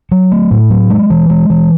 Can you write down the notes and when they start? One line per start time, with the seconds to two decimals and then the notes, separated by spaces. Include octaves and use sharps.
0.11 F#3
0.32 A3
0.51 A2
0.70 F#3
0.90 G#3
1.10 E3
1.30 G#3
1.50 E3